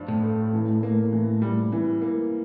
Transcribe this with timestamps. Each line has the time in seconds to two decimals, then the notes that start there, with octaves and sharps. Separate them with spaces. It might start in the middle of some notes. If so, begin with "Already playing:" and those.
Already playing: G2 F3 D4
0.08 A2
0.23 A3
0.53 E3
0.83 A#3
1.12 E3
1.42 G3
1.72 E3
2.02 A#3